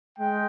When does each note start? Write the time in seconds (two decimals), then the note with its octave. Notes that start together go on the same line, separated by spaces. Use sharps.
0.18 G#3 G5